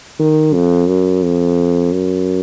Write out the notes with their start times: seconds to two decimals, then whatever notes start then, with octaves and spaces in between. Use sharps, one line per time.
0.19 D#3
0.53 F2
0.88 F#2
1.23 F2
1.92 F#2